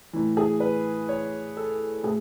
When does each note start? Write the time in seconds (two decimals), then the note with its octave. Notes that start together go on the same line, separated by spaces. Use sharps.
0.13 A2 E3
0.37 G#4
0.60 B4
1.09 C#5
1.57 A4
2.03 A2 G#4